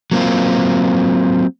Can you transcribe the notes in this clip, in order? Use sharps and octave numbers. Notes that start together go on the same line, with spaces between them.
F#3 A#3 C4 F4